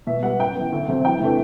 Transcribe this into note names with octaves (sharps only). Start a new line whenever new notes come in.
B2 E5
G3 B3 F#5
F#2 G5
E3 B3
D2
C3 F#3 A3 C4
E2 G5
C3 E3 A3 D4